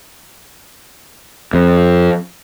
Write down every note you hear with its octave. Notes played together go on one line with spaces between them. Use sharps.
F2